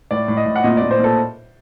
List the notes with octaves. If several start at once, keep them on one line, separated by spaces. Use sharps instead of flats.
A2 D5
A2
D#5
A2
F#5
A#2 D#5
D5
A#2
C5
A#2 A4